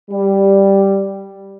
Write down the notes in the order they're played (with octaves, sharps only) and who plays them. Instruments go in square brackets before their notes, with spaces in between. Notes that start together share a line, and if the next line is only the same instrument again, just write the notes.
[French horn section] G3